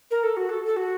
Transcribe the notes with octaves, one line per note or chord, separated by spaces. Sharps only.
A#4
A4
F#4
A4
A4
F#4